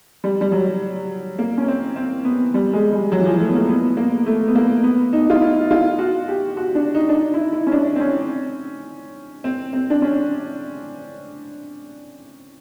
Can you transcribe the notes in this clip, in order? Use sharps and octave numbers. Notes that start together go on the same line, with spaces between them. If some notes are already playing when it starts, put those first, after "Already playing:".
G3
G3
F#3
A#3
C#4
C4
C4
B3
G3
G#3
G3
F#3
E3
F3
A3
B3
A#3
B3
A#3
A3
B3
A#3
B3
D#4
F4
E4
F4
F#4
G4
F#4
D4
D#4
D4
D#4
E4
E4
C#4
D4
C4
C#4
C4
C4
D4
C#4